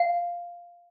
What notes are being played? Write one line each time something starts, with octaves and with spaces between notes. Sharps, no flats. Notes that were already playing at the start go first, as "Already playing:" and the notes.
Already playing: F5